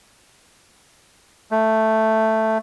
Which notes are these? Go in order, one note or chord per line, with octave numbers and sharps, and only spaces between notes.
A3